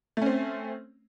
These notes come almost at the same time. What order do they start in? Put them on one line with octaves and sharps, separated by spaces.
A3 C#4 C4